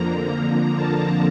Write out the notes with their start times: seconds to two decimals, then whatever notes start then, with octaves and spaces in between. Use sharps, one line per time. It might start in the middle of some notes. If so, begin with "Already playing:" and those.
Already playing: F2 D3 F3 A#3 A#5
0.37 A#5
0.75 A5